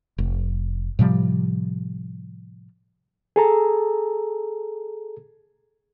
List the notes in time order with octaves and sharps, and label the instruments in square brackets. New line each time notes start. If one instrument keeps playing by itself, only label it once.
[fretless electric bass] F1
A2 C3 F3 G3
[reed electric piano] G#4 A4 A#5